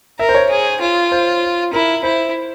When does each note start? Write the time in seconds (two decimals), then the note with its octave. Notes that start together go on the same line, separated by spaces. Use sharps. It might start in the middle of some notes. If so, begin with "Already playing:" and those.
0.19 A#4 E5
0.29 C5
0.35 C#5
0.50 G#4
0.81 F4
1.12 C5
1.73 E4 A#4
2.03 E4 C5